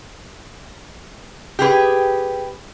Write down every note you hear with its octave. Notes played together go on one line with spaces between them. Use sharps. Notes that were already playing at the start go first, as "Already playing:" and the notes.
G4 G#4 B4